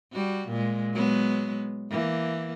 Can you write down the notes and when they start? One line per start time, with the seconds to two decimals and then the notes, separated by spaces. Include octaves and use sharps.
0.13 G3 F#4
0.48 A#2 G#3
0.93 F#3 G#3 B3
1.90 E3 A#3